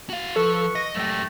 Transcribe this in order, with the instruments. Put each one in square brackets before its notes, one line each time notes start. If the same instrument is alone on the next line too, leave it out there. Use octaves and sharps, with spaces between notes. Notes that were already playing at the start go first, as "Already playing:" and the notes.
[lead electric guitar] F#4 F5
[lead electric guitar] F3 [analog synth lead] A4 [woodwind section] B4 C#6
[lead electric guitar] D#5 [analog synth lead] A#6
[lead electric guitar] F#2 G4 [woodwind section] A3